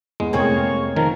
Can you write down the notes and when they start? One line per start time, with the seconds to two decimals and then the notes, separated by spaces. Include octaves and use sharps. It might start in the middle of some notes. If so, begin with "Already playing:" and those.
0.20 E2 G#3
0.33 F1 A#3 C4 G#4 C#5 G5 G#5
0.96 D#3 F3 A#4